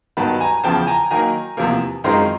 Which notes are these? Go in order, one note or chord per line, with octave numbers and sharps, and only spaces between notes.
G2 D#3 F#3 B3 A5 B5
G#5 A#5
E2 C#3 F3 G5 A5
G#5 A#5
D#3 F#3 A#3 G#5 A#5
E2 C3 F3 A#3
F#2 D#3 G#3 C4 F4 A#5 C6